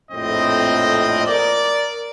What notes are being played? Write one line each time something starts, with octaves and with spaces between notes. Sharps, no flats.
A#1 F2 A2 C4 D#5
A#4 D5